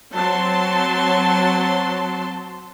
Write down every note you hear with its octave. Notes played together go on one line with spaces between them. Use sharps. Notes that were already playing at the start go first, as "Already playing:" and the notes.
F#3 C4 A5 C6